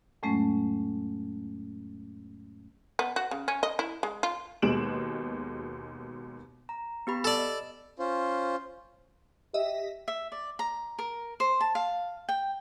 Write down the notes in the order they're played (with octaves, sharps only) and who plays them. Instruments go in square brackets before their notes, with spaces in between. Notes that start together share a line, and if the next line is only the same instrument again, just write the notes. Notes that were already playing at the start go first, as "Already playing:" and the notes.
[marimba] F2 A2 F#3 G#3 A3 C#4
[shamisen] B3
F#4
C#3
C#4
D#5
E4
G#3
F4
[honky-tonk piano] D#2 B2 G#3 D7 E7 F#7
[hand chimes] A#5
B3 G4 B5
[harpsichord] A4 D5
[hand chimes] D#5
[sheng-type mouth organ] C#4 F4 C5
[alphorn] G4 [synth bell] D#5 E5
[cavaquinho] E5
D5
A#5
A#4
C5
A5
F5
G5